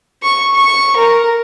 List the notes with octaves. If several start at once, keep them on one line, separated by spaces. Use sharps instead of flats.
C#6
C#6
A#4